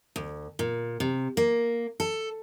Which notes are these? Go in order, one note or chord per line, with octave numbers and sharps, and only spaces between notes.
D2
A#2
C3
A#3
A4